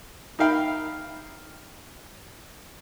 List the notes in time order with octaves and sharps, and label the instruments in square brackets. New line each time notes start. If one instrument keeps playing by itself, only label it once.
[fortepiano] D#4 A#4 E5 F5 G5 B5